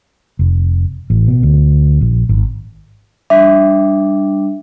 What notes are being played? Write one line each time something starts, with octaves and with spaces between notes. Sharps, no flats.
F1
A1
B2
D2
A#1
G#1
G3 D4 E5